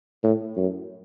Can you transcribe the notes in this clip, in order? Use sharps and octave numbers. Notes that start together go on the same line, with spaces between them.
A2
F#2